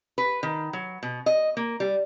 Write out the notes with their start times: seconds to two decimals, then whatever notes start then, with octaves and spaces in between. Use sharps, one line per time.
0.18 B4
0.43 D#3
0.73 F#3
1.03 B2
1.26 D#5
1.57 A#3
1.80 G3